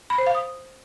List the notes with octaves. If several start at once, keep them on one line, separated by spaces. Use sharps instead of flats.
B5
C5
F5
D#6